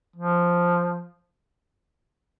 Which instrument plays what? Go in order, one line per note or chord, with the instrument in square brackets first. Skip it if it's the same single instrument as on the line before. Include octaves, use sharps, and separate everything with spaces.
[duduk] F3